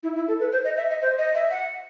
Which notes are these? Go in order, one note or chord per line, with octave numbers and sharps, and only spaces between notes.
E4
E4
A4
B4
C5
D#5
E5
D#5
C5
D#5
E5
F#5